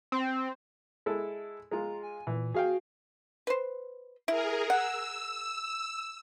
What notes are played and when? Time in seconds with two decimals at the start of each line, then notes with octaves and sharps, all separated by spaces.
0.12 C4
1.06 G#3 E4 A4
1.71 G#3 F4 A#5
2.03 G#5
2.27 A#2 E3
2.54 F#4 G#4 F5 G5
3.47 B4 C5
4.28 E4 G#4 A#4
4.70 F#5 E6